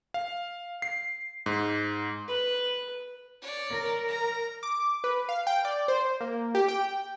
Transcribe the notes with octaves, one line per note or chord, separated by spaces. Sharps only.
F5
C7
G#2
B4
C#5 D5
A#4
A#5
D6
B4
F5
G5
D5
C5
A#3
G4
G5